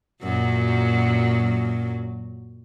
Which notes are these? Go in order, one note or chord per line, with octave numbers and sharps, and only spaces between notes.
F#2 A#2 F#3